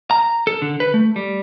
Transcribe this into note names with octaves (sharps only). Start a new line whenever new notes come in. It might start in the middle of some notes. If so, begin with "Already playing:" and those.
A#5
A4
D3
B4
A3
G3